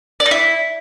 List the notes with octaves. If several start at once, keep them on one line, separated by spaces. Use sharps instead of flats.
D5
D#4
E4